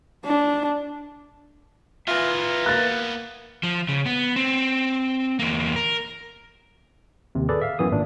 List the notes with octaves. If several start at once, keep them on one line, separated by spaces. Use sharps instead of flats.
D4
B3 F4 A#4 B4 E5
A#3 F#6 A6
F3
C#3
B3
C4
E2 A#3
A#4
D#2 C3
G#4 A4 B4 D5
E5 F5
F#2 E3 B3 D#6
G#1 A#2 D4